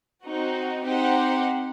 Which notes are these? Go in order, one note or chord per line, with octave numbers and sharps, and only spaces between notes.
C4 D#4 F#4
C4 D#4 G4 C5 F#5